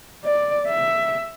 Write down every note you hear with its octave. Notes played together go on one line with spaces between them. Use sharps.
D5
E5